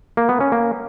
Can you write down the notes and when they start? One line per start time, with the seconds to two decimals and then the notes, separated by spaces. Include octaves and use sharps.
0.17 A#3
0.29 B3
0.40 C#4
0.52 A#3